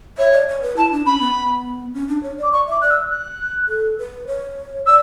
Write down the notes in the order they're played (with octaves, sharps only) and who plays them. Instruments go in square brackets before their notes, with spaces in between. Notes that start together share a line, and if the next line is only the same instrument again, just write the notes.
[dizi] C#5 [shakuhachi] E5
[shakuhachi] D5
C#5
B4
[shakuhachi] E4 [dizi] A5
[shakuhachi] D4
[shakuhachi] C#4 [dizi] B5
[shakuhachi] B3
C#4
D4
C#5
[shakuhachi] D5 [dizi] D6
[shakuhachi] D5 [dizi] C#6
[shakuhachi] E5 [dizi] D6
[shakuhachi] D5 [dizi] F#6
[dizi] E6
F#6
[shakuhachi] A4
B4
C#5
[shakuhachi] D5 [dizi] E6